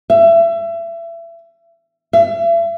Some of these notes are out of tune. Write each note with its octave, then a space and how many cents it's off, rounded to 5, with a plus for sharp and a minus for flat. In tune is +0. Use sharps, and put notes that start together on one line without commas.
E5 +30
E5 +40